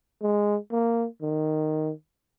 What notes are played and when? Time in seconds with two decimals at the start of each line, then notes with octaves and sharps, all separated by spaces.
0.22 G#3
0.72 A#3
1.22 D#3